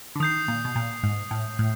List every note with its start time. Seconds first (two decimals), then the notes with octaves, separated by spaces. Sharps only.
0.16 D3
0.20 D#3 D#6 G6 C7
0.48 A#2
0.65 B2
0.75 A#2
1.03 G#2
1.31 A2
1.59 A2